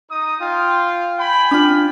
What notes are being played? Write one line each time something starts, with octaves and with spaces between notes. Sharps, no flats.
D#4 D#6
F4 G5
G5 G#5 B5
D4 F4